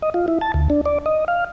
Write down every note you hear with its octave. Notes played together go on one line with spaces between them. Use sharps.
D#5
F4
E4
A5
D2
D4
D5
D#5
F5